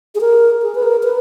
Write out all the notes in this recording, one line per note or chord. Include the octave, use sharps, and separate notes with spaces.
G#4
A#4
G#4
B4
A#4
B4